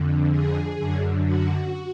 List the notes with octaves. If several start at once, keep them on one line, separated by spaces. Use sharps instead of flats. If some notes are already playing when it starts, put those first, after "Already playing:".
Already playing: F2 D3
G#4
F#2 D3
F#4